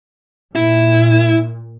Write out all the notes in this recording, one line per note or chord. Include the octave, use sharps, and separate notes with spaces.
A#2 E4